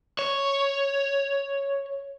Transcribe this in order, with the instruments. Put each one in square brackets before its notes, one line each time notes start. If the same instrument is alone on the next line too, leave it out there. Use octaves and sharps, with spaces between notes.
[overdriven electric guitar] C#5